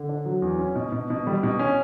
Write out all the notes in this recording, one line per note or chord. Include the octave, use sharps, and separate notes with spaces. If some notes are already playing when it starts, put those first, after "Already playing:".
Already playing: D3
D4
F#3
E2
C#4
B2
B2
B2
G3
B2
C#4